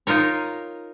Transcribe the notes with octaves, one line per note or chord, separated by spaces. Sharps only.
D#4 F4 A#4 C#5